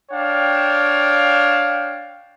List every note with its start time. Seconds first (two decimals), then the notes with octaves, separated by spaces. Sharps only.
0.11 D4 C#5 F5 G5